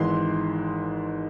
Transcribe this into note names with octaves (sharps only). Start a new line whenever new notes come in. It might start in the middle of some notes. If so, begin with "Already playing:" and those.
Already playing: G#1 G#2 E3 C6